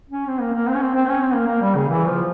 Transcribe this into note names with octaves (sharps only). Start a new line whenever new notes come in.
C#4
C4
A#3
A#3
C4
C#4
C4
C4
C#4
C4
A#3
A#3
G3
C#3
E3
F3